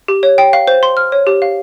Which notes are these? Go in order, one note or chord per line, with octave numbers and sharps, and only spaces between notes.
G4
C#5
G5
F5
C5
C6
F6
C#5
G4
F5